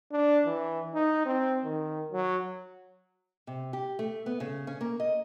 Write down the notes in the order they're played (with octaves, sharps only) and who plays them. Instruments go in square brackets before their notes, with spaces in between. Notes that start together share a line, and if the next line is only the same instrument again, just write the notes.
[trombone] D4
E3
D#4
C4
D#3
F#3
[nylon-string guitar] C3
G4
A3
B3
C#3
C#4
A#3
D#5